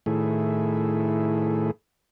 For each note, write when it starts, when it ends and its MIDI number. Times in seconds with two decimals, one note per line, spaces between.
0.06 1.71 45
0.06 1.71 51
0.06 1.71 57
0.06 1.71 64
0.06 1.71 68